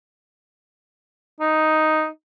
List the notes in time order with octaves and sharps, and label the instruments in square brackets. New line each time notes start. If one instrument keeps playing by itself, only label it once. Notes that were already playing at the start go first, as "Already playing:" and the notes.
[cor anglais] D#4